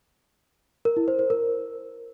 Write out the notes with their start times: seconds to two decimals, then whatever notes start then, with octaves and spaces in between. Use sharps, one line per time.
0.85 A#4
0.97 E4
1.08 C5
1.19 C5
1.30 A#4